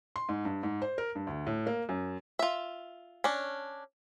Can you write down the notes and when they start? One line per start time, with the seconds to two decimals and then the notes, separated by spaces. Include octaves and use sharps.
0.16 C6
0.29 G#2
0.45 G2
0.63 G#2
0.82 C5
0.98 A#4
1.15 G2
1.27 D2
1.47 A2
1.67 A#3
1.89 F#2
2.39 F4 E5
3.24 C#4 D4